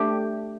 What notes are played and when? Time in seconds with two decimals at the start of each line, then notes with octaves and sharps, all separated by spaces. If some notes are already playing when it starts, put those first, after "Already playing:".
Already playing: A3 D4 G4